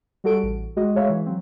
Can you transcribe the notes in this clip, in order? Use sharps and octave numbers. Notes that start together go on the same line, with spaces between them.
G3 F#4 A4 D7
A1
G#3 F#4 D#5
G#3 A3 G#4 C#5 E5 F5
E3
F#3 C4